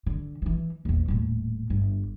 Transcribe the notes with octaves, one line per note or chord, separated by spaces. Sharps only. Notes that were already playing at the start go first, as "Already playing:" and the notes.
D3
D#3 E3
A#1 E2
D#1 A2
G1